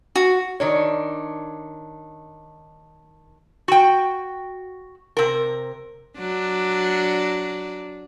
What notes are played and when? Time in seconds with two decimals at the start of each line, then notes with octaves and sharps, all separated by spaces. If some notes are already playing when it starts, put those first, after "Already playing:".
0.16 F#4
0.60 D#3 D4 C#5
3.68 F#4 G5
5.17 C3 A#4
6.19 F#3 D4